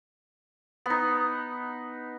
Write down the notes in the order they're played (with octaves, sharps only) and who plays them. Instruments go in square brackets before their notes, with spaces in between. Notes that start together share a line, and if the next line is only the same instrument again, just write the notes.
[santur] B3 D#4